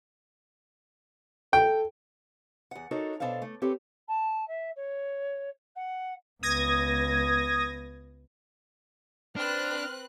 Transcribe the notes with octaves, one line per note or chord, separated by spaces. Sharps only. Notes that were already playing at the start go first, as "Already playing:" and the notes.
A4 G5
E2 F#5
D4 D#4 F#4 A4 A#4 C#5
B2 D4 A4 C5 F5
A3
C4 G4 A4 B4 C#5
A5
E5
C#5
F#5
C#2 B3 D#6 G#6 A#6
C4 D4 B4 F6 F#6